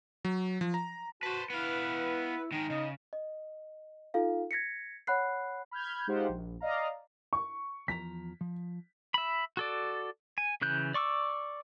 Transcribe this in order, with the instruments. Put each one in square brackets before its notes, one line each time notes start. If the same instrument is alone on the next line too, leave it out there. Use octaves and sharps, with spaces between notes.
[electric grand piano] F#3
F3
A#5
[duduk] F#4 [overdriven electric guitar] B4 C5 [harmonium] A5
[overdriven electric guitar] B3 F5 [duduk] E4 [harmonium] B4
[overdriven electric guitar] D#3 G#3 [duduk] D#4
[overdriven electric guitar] C#3 [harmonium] D#5
[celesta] D#5
D#4 F4 A4 F5
G#6 A#6 B6 C#7
C#5 F#5 B5 F#6 C7
[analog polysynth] B5 F6 G6 G#6
G#3 D#4 F4 G4 C5 F#5
A#1
D5 D#5 F5 A#5
[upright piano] C#6
[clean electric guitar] E2 F3 A#5 [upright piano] B6
[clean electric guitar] F3
[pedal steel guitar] E5 B5
F#4 A4 D5
G#5
C#3 E3 F#6 G6
D5 C#6 D6 E6